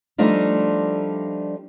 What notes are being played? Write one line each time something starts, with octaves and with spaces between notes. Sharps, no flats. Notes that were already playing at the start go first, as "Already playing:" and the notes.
F3 G3 A3 D4 D#4 F4